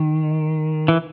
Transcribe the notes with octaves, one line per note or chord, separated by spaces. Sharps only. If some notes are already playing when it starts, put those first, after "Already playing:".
Already playing: D#3
E3